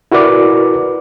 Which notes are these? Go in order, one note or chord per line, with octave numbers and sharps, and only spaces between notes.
E4 F#4 A#4 B4 D5 D6